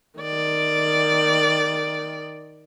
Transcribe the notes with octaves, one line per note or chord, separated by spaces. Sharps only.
D#3 D5